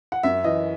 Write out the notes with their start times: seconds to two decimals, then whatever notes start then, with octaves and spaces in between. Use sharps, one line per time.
0.12 F#5
0.23 F#2 E5
0.44 E3 D#5